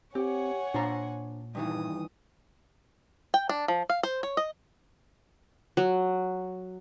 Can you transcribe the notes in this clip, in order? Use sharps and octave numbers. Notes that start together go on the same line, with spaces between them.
C4 G4 C#5 F#5 G#5
A#2 D4 C5 A#5
G2 D#3 E3 D#6
G5
D4
F3
F5
C5
C#5
D#5
F#3